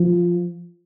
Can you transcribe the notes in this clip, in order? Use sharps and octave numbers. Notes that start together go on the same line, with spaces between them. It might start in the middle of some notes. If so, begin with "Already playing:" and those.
Already playing: F3